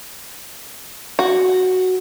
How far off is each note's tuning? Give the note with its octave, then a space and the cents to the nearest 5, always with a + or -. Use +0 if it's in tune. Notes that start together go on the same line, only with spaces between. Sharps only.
F#4 +0